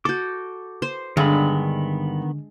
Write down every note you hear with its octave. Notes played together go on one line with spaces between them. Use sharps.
F#4 A4 D6 G6
C5
G2 D3 D#3 G#3 B3 B5